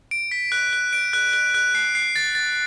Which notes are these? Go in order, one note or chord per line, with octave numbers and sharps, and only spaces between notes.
D7
B6
F#6
F#6
D7
F#6
F#6
F#6
C7
C7
A6
A6